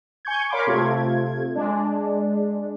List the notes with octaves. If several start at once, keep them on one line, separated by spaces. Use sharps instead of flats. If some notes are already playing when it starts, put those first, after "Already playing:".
G#5 C#6 G6 G#6
A#4 C#5 F5 B5 C6 D6
C3 A3 F4 G#6
G#3 D4